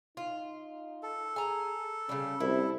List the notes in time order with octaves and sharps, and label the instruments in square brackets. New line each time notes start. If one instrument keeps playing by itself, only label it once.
[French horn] D#4 [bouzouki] F4
[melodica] A4
[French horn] G#4 [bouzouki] G#5 A#5
[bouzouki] C#3 G3 [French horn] C#4
[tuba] C2 [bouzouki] E4